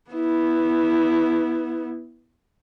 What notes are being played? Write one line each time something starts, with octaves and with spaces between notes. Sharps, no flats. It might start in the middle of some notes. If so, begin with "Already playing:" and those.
B3 E4